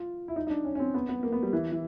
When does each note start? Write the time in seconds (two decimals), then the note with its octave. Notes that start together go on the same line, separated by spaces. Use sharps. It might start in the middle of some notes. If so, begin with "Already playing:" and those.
Already playing: F4
0.28 E4
0.36 D#4
0.47 D#4
0.50 D4
0.65 C#4
0.75 C#4
0.79 C4
0.94 B3
1.09 B3
1.23 A#3
1.33 B3
1.43 G3
1.53 E3
1.72 E3